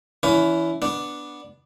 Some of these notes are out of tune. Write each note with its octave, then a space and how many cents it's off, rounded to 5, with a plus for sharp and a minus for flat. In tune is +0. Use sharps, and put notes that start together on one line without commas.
E3 +0 C#4 +30 B4 +15
B3 -10 D4 +0